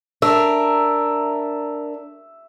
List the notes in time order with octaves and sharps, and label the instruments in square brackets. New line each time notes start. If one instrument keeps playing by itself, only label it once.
[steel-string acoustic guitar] D4 A#4 [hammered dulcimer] E5